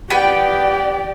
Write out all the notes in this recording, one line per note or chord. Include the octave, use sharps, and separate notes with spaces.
B3 G4 D5 G5